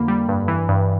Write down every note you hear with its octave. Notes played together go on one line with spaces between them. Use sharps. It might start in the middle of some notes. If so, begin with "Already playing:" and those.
Already playing: F2 D3 A#3 B5
G3
G2
E3
G2